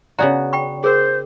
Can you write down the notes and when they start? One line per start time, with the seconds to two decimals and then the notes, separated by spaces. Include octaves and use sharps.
0.19 C#3 B3 D4 F#4 D5 A#5
0.53 G5 B5 C#6
0.84 G#4 A#4 C5